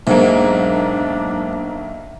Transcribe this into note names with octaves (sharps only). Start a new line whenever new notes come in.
B1 G#2 A#3 D4 E5